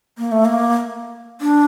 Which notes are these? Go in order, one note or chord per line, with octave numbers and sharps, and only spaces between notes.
A#3
A3
A#3
D4